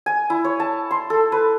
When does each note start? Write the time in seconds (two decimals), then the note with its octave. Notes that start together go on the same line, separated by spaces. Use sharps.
0.06 G#5
0.30 E4
0.44 C#5
0.60 A5
0.91 C6
1.10 A4
1.32 B4